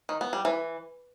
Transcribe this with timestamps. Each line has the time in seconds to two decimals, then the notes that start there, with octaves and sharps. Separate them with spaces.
0.09 D#3
0.21 B3
0.33 G3
0.45 E3